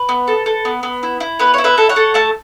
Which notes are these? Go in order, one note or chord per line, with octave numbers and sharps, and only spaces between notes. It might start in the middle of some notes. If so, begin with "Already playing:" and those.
Already playing: B4
B3
A4
A4
B3
B3
E4
E4
B3 B4
E4 C#5
B4 E5
A4
C#5 F#5
A4
A3 E5 A5